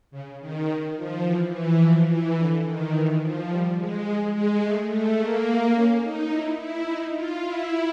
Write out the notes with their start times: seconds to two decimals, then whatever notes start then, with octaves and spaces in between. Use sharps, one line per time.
0.11 C#3
0.40 D#3
0.96 F3
1.24 E3
1.52 E3
1.81 F3
2.09 E3
2.37 D3
2.65 D#3
2.94 E3
3.21 F3
3.49 G3
3.78 G#3
4.06 G#3
4.34 G#3
4.61 A3
4.90 A3
5.18 A#3
5.74 C#4
6.02 D#4
6.30 E4
6.59 E4
6.87 D#4
7.15 F4
7.43 E4